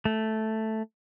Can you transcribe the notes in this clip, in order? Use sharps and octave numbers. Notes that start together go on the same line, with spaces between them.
A3